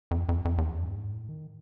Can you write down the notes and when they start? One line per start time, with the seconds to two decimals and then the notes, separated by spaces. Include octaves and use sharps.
0.11 F2
0.29 F2
0.45 F2
0.58 E2
0.71 F2
0.82 G2
0.95 G#2
1.13 A2
1.29 D#3